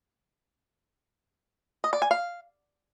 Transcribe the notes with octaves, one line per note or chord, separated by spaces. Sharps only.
D#5
D5
G#5
F5